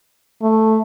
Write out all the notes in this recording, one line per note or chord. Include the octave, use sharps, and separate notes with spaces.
A3